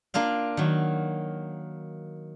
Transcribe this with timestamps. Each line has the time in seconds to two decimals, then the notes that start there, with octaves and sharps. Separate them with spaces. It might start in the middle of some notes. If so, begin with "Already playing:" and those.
0.14 A#3 D4 F4 F5
0.57 D#3 F#3